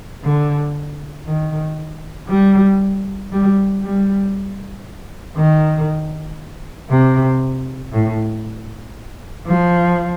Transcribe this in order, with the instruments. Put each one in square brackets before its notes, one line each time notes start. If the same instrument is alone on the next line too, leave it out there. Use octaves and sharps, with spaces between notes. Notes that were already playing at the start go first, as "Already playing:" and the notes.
[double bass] D3
D#3
G3
G3
G3
D#3
C3
A2
F3